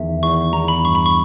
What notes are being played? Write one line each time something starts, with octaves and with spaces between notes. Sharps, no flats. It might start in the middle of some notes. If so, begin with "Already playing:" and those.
Already playing: E2 D#3 E5
E2 C#6
E2 A#5
B5
G2 C#6
B5
C#6